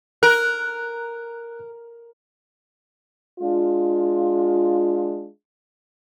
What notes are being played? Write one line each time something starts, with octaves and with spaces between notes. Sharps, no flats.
A#4 F#6
G#3 D4 F4